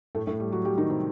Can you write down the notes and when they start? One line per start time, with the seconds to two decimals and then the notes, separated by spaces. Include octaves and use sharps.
0.15 A2 A3
0.27 A2 A3
0.40 G3
0.52 F#3 F#4
0.65 G3 G4
0.78 D#3 D#4
0.90 C3 C4